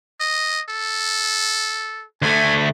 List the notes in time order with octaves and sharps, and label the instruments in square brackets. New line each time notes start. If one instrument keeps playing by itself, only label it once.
[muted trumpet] D#5
A4
[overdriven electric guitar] D2 A3 [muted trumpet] G#5